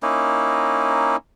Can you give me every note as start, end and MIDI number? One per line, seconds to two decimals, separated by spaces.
0.03 1.16 58
0.03 1.16 61
0.03 1.16 63
0.03 1.16 64